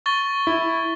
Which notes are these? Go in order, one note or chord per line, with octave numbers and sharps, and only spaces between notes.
C#6 A6 G7
E4